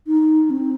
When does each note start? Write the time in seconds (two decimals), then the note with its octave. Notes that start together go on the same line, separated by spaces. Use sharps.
0.07 D#4
0.50 C4